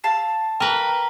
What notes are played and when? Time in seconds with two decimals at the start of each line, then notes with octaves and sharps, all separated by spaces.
0.04 F5 A5 E6
0.60 A#4 B4 G5 A#5